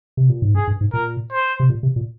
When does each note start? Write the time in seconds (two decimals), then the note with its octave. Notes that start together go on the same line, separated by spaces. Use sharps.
0.17 C3
0.30 A#2
0.42 G#2
0.55 G2 G#4
0.67 G2
0.81 G#2
0.93 A#2 A#4
1.32 C5
1.60 C3
1.70 A#2
1.83 C3
1.96 A#2